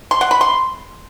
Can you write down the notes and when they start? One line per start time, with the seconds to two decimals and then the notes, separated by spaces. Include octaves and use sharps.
0.11 C6
0.21 F#5
0.31 B5
0.41 C6